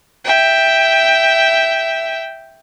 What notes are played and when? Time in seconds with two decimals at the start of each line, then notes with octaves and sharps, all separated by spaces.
0.24 E5 G5